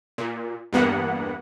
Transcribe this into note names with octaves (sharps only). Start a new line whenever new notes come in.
A#2
E2 G2 A#3 B3 F#5